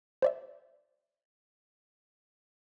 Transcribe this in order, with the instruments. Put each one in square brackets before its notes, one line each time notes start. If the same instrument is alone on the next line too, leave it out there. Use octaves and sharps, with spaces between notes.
[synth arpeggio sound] C5 D5 E5